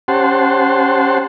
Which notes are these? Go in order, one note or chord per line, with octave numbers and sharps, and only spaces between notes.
C#4 G4 C5 F#5 A5 C6